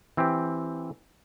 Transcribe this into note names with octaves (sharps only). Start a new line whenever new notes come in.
E3 C4 G4